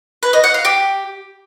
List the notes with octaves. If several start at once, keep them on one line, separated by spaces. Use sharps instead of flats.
B4
D#5
F#5
F5
G4